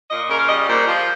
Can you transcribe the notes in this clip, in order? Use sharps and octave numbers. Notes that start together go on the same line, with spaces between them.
A#2 D#5
C#3 A#4
F5
G3 D#5
A#2 C5
F3